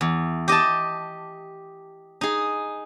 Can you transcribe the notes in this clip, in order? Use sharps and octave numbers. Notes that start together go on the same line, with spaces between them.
E2
G4 D#5 G5 A5
D#4 G#4